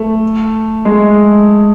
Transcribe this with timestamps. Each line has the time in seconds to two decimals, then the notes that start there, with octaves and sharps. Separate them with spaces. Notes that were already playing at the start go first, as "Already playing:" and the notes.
Already playing: A3
0.85 G#3